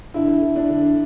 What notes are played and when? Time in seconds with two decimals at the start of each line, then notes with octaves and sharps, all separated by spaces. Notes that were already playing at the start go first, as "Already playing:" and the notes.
0.14 D3 E4
0.42 D3
0.56 D4
0.69 D3